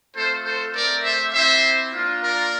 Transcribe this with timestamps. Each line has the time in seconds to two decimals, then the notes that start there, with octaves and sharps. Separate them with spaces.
0.16 A3 C4 F4 A4 C5
0.45 A4 C5
0.75 A3 C4 G4 A#4 D5
1.04 C5 E5
1.33 C4 E4 G4 C5 E5
1.92 A#3 D4 F4
2.22 A#4 D5